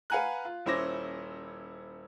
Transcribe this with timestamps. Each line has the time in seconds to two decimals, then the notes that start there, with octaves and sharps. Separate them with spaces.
0.10 B4 F5 F#5 G#5 A#5 F#6
0.45 F4
0.66 D#1 C#4 E4 C5 D6 A#6